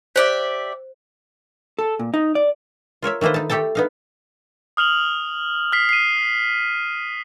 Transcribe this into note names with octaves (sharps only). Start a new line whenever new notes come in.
G4 C5 D5 E5
A4
A#2
D#4
D5
F4 A#4 C#5 E5
D#3 A3 A#3 B4 C5
D#4 A5
A3 G4 A4 G5 A5
B3 D#4 F5
D#6 F6 F7 F#7
F6 B6 C7
C7 D#7